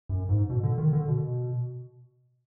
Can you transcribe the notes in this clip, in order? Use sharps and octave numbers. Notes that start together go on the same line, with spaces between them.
F#2
G#2
B2
D3
D#3
D3
B2